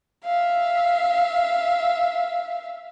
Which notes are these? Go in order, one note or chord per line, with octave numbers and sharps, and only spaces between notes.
E5 F5